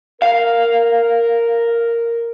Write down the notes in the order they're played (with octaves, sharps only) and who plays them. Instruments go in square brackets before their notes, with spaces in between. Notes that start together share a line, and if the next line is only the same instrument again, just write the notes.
[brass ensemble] A#4 [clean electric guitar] F5